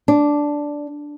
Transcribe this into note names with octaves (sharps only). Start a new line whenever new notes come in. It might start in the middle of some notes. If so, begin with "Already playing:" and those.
D4